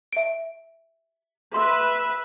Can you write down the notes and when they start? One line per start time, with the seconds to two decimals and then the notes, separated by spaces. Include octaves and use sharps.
0.13 E5 D7
1.54 B4 E5 C6